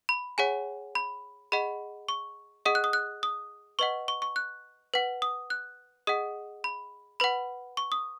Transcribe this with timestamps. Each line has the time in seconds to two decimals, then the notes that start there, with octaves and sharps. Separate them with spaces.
0.09 B5
0.38 G#4 C#5 F#5 G#5
0.95 B5
1.52 G#4 D#5 F#5 B5
2.09 C#6
2.65 G#4 D#5 F#5 D#6
2.75 F#6
2.84 D#6
2.93 F#6
3.23 D#6
3.79 B4 D#5 F#5 C#6
4.08 C#6
4.22 C#6
4.36 F#6
4.94 B4 F#5
5.22 D#6
5.50 F#6
6.07 G#4 D#5 F#5 D#6
6.64 B5
7.20 B4 F#5 B5
7.77 C#6
7.92 D#6